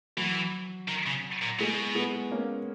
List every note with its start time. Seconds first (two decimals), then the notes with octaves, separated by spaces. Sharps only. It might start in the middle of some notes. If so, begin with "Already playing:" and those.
0.17 E3 F#3
0.88 D#3
1.07 C#3
1.42 A#2
1.59 B2 G#3
1.95 G#3 B3
2.32 A#3 C#4